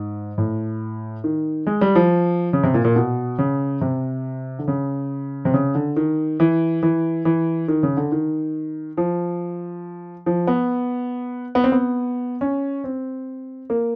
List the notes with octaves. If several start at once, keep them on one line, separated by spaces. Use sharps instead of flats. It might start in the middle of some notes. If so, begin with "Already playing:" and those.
Already playing: G#2
A2
D#3
G#3
G3
F3
C#3
C3
A#2
A#2
B2
C#3
C3
D3
C#3
C3
C#3
D3
D#3
E3
E3
E3
D#3
C#3
D3
D#3
F3
F3
B3
B3
C4
B3
C#4
C4
A#3